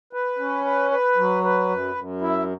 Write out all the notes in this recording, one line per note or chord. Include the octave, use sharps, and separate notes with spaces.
B4
C#4
B4
B4
F#3
B4
F#2
F#2
E4